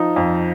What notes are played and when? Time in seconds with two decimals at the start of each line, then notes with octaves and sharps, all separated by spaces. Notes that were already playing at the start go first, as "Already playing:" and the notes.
Already playing: F3 D#4
0.16 F2